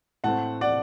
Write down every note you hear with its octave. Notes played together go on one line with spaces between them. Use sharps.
A2 A3 C4 F#5 A5
D5 F#5